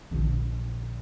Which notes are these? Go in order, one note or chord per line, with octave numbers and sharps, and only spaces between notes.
A#1 D3